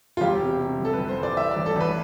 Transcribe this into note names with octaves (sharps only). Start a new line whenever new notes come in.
F4
E1 G4
C3
C3
F1
A4
F1 B4
C5
E3
D5
E3 E5
D5
A1
A4
A1 B4